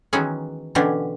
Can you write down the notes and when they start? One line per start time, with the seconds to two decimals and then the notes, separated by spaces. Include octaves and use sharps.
0.13 D#3 E3 F#3 G#3 B3 C#4
0.75 B2 D3 E3 C#4 D4 G4